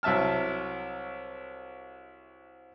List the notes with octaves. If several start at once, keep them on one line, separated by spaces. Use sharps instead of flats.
C2 F#3 E5 A5 F6